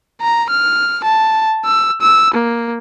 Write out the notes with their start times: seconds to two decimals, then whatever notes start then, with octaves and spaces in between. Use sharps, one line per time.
0.21 A#5
0.50 F6
1.04 A5
1.65 E6
2.01 E6
2.34 A#3